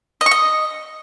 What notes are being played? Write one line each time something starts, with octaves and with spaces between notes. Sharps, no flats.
D#5
C#6
D#5